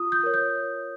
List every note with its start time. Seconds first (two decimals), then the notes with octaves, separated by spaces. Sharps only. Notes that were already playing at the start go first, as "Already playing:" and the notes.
Already playing: F4 D#6
0.12 G6
0.23 A#4 C#5
0.34 G6